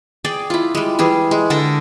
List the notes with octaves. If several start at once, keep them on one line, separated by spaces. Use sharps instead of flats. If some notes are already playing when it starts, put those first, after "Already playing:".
G#4 D5 G5
E4 F4
G3 G#3
E3 G3 G#4
G#3
D3 A4 A#4